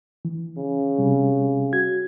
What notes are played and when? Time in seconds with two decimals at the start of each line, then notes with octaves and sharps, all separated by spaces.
0.25 E3
0.57 C#3
0.98 C3 G3
1.73 F#4 G#6